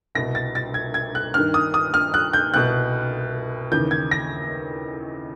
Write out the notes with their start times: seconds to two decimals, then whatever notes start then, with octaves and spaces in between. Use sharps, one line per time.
0.15 C2 B2 A#6
0.35 A6
0.55 A6
0.74 G#6
0.94 G#6
1.15 F#6
1.34 G2 D#3 F6
1.54 D#6
1.74 D#6
1.94 F6
2.14 F#6
2.33 G6
2.54 C2 B2 F#6
3.72 D#2 C#3 E3 G6
3.91 G#6
4.11 A#6